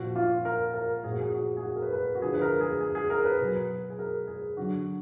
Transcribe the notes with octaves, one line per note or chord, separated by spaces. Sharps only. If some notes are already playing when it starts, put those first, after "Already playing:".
Already playing: A#2 F3 F#4
F4
A#4
A#4
A#2 F3 G#4
F#4
G#4
F#4
G#4
F#4
A#4
B4
B4
A#4
F#4
D3 F3 G#4
B4
A#4
G#4
G#4
G#4
A#4
B4
B2 F#3
G#4
A#4
G#4
D3 F#3 F#4